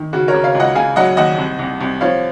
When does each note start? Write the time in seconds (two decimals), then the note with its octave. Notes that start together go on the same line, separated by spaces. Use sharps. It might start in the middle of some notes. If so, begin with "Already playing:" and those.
Already playing: D#3
0.13 C#3 F#4
0.28 A#4 C#5
0.34 C#3
0.44 C#5 F5
0.55 C#2
0.60 D#5 F#5
0.75 C#3 F5 G#5
0.96 F#3 D#5 F#5
1.17 D#2 D#5 F#5
1.38 C2
1.59 C2
1.81 C2
2.01 F3 C#5 F5